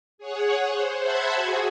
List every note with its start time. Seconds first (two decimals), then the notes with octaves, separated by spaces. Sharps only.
0.18 G#4 C#5 F#5
0.68 C5
0.98 C5 E5 F#5 A5 B5 G#6
1.35 F#4 G#4